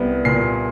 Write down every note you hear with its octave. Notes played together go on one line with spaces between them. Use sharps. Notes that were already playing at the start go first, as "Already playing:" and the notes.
Already playing: C2 G3 B3
A#2 C7